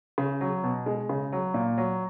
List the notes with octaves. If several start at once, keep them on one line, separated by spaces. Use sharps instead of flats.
C#3
F#3
B2
G#3
C#3
F#3
A#2
F#3